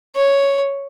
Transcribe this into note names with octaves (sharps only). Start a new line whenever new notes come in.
C#5